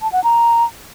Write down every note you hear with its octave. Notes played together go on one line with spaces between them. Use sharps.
A5
F#5
A#5